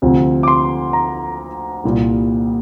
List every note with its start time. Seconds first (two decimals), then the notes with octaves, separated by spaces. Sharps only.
0.02 D2 C3 F3 C4
0.43 D6
0.48 C6
0.93 A#5
1.84 C2 A#2 G3